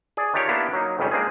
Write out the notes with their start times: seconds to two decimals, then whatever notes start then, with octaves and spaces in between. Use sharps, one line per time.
0.17 G#4 D5
0.33 D#3 D4 F4 G4 C#5
0.48 A#3 B3 D4 E4 F4 G4
0.73 F#3 A#3 D#4
0.99 F2 G#2 C#3 G3 C#4
1.11 G#3 A#3 C4 D4 G#4